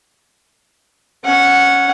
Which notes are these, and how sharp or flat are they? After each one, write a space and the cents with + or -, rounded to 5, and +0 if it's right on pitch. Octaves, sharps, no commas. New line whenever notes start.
C#4 +5 F#5 -10